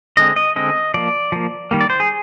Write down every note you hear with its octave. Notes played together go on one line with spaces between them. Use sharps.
D3 G#3 C4 D#5
D#5
D3 G#3 C4 D#5
F3 A#3 D5
F3 A#3
D#3 G3 A#3
D5
C5
G#4